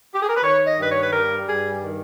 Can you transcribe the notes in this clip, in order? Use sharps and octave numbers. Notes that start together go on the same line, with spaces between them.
G4
G#4
A#4
B4
D#3 C#5
D#5
G2
B4
C#5
B4
G3 A#4
G2 G#4
D#3